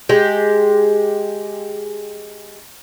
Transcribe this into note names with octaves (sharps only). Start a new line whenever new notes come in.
G#3 G4